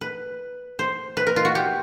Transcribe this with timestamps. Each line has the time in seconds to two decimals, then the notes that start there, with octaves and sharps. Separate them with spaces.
0.01 B4
0.79 C5
1.17 B4
1.27 A#4
1.36 F4
1.45 F#4
1.55 G4